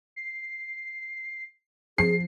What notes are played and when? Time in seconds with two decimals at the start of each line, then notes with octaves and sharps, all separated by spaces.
0.16 C7
1.98 F3 G#4 C7